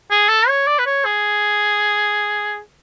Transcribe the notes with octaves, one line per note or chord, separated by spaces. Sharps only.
G#4
A4
C#5
D5
B4
C#5
G#4